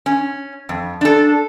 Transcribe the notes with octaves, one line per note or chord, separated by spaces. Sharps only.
C#4
F2
D4 A4